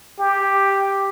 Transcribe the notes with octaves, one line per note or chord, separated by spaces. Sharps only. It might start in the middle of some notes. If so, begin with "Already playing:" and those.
G4